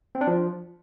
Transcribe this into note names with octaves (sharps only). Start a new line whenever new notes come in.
C4
D4
F3